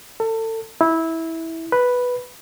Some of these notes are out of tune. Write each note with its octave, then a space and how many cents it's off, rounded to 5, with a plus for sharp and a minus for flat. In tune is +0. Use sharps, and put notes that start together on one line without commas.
A4 +30
E4 -15
B4 -5